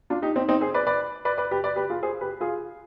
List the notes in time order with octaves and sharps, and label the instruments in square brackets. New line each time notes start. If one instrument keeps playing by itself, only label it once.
[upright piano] D4 F4
D#4 G4
C4 D#4
C4 D#4
G#4 C5
B4 D5
B4 D5
B4 D5
B4 D5
G4 B4
B4 D5
G4 B4
F4 G#4
G#4 C5
G4 B4
F4 G#4